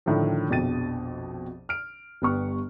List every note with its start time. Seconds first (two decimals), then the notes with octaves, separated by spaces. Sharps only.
0.06 A2 D3 D#3 F3
0.50 A#1 F2 B2 G5 A6 D#7
1.69 F6 D7
2.22 G1 G3 B3 G4 C#6 F6